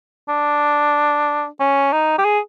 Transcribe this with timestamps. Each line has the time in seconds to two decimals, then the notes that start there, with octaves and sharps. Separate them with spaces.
0.29 D4
1.60 C#4
1.93 D#4
2.19 G4
2.25 G#4